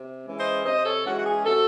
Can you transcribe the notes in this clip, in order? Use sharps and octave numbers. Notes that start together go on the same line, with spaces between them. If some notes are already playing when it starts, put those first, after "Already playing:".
Already playing: C3
E3 G#3 C#4
C5 D#5
C3 C5 D#5
C5
A4 C#5
E3 G#3 C#4 F#4
F#4
G#4
C3 F#4 A4